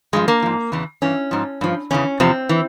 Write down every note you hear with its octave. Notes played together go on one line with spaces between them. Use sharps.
G2 F3 G#3
A#3
G#2 F3
E2 C#3 E3
G2 E3 C#4
G#2 F3
G2 F3
E2 C#3 E3 C#4
E2 C3 F3 C4
E3